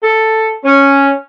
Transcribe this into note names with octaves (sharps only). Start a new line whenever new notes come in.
A4
C#4